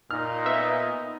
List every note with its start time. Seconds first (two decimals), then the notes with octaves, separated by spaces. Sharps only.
0.11 A#2 D#4 F6
0.46 B3 E5